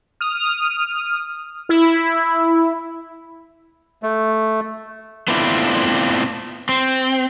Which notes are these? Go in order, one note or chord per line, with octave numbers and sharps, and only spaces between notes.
D#6 F6
E4
A3
A3 B3 C4 D4 E4 F4
C4